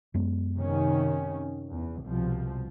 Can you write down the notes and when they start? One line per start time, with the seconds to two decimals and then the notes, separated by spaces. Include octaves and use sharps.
0.14 F#2 G#3 B3
0.56 C3 D#3 C#4
1.71 E2
2.03 C2 B2 F3